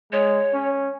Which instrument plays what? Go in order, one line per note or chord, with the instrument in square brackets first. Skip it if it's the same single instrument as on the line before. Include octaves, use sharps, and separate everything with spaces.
[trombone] G#3 [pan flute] C#5
[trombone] C#4